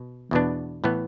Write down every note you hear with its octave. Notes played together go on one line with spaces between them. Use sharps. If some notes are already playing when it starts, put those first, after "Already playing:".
Already playing: B2
E2 B2 B3 D4
A2 E3 B3